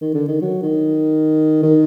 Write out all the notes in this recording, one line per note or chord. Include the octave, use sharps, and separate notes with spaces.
D#3
D3
D#3
F#3
D#3
D#3